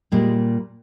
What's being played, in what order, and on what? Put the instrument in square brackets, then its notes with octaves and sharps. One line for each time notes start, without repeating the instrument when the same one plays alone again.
[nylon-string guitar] A#2 G3 G#3